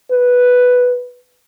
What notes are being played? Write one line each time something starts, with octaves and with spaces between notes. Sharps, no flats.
B4